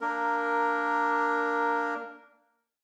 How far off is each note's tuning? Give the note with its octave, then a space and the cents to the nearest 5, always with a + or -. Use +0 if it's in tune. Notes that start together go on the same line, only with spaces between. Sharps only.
A#3 -5 D4 +0 A#4 +0